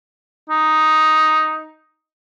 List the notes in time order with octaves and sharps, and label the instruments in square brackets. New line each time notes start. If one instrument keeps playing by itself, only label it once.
[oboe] D#4